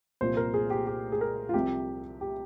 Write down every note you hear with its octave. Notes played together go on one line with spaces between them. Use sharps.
C2 A#2 F3 C5
A#4
G#4
G4
G4
G#4
A#4
F4
C2 C3 F3 G4
G4